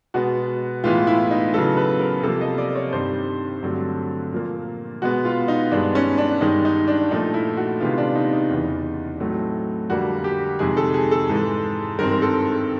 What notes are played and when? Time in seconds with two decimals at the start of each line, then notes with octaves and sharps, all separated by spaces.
0.14 B2 G#3 B3 F#4
0.84 A2 E3 G#3 B3 F4
1.07 E4
1.31 D#4
1.54 C#3 F#3 B3 A4
1.77 B4
2.00 A#4
2.23 C3 F3 A#3 A4
2.41 D#5
2.58 D5
2.75 C#5
2.93 G2 D#3 G3 C4 C5
3.63 G2 D3 F#3 A3 C4
4.32 A#2 F3 A#3
5.02 B2 G#3 B3 F#4
5.25 F4
5.48 D#4
5.72 G2 D#3 G#3 B3 D4
5.95 C#4
6.18 D4
6.41 G2 D#3 G#3 D#4
6.65 D#4
6.88 D4
7.11 A#2 F3 A3 D#4
7.34 E4
7.57 F#4
7.80 C3 D#3 G#3 B3 F4
7.98 D4
8.15 D#4
8.33 D#4
8.50 E2 C#3 E3
9.20 A2 F#3 A3 C4
9.90 F2 D3 G3 A#3 F#4
10.24 G4
10.59 F2 C3 D#3 G#3 G#4
10.77 A4
10.94 G#4
11.11 A4
11.29 G#2 E3 G#3
11.98 G2 D#3 G#3 C4 A#4
12.12 A#4
12.22 A4